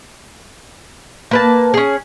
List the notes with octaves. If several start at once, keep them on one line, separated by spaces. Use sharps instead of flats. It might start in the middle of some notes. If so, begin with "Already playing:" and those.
A#3 B4 A5
C#4 G#4